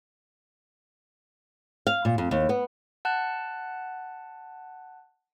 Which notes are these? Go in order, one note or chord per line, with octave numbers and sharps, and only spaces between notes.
F5
A#2
F2
D#2
B3
F#5 A5 F#6